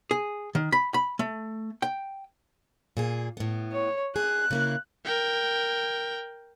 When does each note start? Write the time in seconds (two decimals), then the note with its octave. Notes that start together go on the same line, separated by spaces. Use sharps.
0.11 G#4
0.55 D#3
0.72 B5
0.94 B5
1.19 A3
1.82 G5
2.97 A#2 A#3 G#4
3.37 A2 B3
3.72 C#5
4.16 G#4 F#6
4.51 C#3 A#3 E4
5.05 A#4 G5